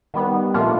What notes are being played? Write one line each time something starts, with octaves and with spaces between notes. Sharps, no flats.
D#3 G3 B3
A#2 F3 A3 D4 F4